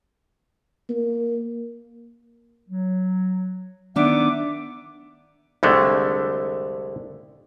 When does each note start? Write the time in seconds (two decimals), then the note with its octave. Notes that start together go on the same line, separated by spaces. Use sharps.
0.89 A#3
2.69 F#3
3.96 D#3 B3 D4 E5 F#5 D6
5.63 C2 F2 D3 G#3 A3